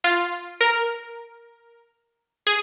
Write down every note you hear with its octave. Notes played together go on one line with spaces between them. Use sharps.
F4
A#4
G#4